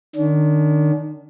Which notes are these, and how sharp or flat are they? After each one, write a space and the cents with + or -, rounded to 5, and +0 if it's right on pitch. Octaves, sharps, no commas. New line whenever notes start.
D#3 -35 D4 -45